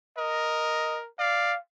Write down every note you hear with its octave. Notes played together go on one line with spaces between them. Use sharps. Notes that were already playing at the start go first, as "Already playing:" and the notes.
A#4 D#5
D5 F5